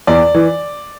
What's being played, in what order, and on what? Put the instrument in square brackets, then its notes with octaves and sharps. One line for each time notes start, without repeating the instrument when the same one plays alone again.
[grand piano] E2 [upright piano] D5
[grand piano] E3